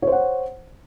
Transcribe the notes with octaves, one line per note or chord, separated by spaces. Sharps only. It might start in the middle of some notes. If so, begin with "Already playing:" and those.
C5 C#5 F#5